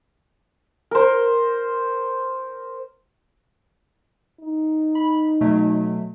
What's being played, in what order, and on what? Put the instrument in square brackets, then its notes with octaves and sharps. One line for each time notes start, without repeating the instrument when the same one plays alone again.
[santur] A#4 C5
[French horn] D#4
[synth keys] B5
B2 F#3 A3